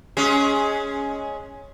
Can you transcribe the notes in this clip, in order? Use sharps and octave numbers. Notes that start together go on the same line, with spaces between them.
G#3 C#4 G#4